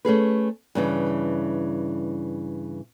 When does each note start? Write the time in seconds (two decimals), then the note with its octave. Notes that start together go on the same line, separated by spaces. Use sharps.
0.05 A3 C#4 G#4 B4
0.75 G2 C#3 E3